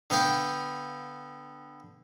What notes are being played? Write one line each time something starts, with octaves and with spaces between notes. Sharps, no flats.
D3 B3 F5 G5